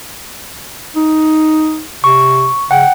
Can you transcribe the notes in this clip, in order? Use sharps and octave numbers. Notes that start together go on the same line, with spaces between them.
D#4
C3 C#6
C#3 F#5 G5